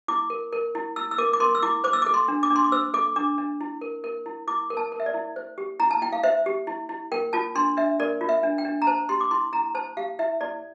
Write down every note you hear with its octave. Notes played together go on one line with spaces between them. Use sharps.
E4 D6
A#4
A#4
E4
E4 E6
E6
A#4 D6
D6
A#4 C6
E6
E4 D6
C5 D6
E6
A4 D6
C6
D4
D6
D4
C6
D6
C5 E6
A4 D6
D4 D6
D4
E4
A#4
A#4
E4
E4 D6
A#4
A5
A#4
E5
D5
E4
C5
G4
E4 A#5
A5
E4 G5
F5
C5 E5
G4
E4
E4
A#4 G5
F4 A5
D4 C6
D4 E5
A#4 D5
F4
E5
D4
G5
D4
A#5
C5 A5
G4 C6
D6
E4 C6
E4 A#5
C5 A5
G4 F5
E4 E5
E4 D5